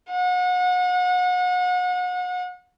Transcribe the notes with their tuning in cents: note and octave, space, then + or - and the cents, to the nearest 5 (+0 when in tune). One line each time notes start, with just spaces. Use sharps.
F#5 -35